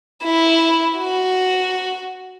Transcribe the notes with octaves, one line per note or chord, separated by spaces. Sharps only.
E4
F#4